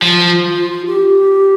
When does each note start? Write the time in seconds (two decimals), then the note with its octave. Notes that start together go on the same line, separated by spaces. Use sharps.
0.01 F3 F4
0.86 G4